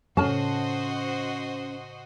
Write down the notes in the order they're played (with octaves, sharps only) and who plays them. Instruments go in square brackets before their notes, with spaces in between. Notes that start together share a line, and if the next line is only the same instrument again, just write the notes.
[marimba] A2 C#3 [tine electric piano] C#4 [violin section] F#4 C5 D#5 [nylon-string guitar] A5